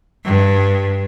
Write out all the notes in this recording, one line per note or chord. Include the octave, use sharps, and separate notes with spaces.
G2